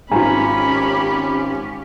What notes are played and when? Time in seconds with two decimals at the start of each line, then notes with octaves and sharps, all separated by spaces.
0.12 G#1 C#4 F4 G4 G#5 A#5 B5